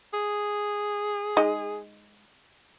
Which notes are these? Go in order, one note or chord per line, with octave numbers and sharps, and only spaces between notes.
G#4
G#3 D#4 D#5